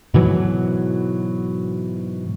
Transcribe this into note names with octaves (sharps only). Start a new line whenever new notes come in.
G#2 B2 E3 F#3